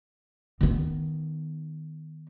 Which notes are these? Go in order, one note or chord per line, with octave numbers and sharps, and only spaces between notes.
D#3 B3